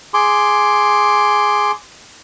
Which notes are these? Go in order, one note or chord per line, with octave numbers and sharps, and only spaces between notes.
G#4 C6 D6